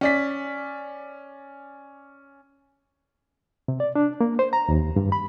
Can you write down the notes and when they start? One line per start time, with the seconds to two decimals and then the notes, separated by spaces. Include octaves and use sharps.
0.01 C#4 D5 B6
3.68 C3
3.80 D5
3.96 D4
4.21 A#3
4.39 C5
4.53 A#5
4.69 D#2
4.96 G2
5.12 B5